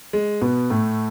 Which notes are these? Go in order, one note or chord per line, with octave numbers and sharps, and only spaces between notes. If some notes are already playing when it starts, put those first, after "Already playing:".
G#3
B2 B3
A2 A3